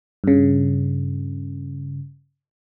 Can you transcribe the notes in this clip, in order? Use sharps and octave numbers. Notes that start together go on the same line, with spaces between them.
G2 C#3